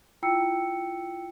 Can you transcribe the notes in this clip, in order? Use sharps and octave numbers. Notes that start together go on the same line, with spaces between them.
E4 F4 G5 E6 C#7